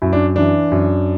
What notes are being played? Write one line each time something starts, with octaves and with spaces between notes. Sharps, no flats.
F#2 E4
D4
E3 D4
F#2